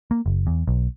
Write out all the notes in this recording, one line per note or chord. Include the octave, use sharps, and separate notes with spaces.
A#3
F#1
E2
B1